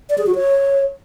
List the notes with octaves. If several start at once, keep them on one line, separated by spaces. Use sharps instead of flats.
D5
G#4
F#4
C#5